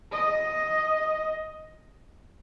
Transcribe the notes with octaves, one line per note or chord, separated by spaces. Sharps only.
D#5